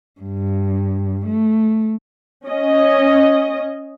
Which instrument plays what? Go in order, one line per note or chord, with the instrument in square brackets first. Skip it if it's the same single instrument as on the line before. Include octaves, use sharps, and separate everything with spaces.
[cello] G2
A3
[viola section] C#4 D#5